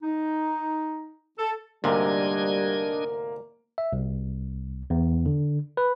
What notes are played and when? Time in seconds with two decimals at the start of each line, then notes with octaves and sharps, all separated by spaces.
0.03 D#4
1.39 A4
1.84 D2 G#2 C3 G3 A#3 D4 D#5 G#6
3.78 E5
3.93 C2
4.90 E2
5.26 D3
5.77 B4